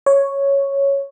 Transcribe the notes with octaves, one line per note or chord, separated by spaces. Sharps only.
C#5